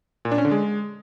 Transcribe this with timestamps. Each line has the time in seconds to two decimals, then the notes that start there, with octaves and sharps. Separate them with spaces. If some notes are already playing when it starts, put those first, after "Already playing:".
0.25 A#2
0.32 D4
0.38 C#4
0.45 D3
0.51 G#3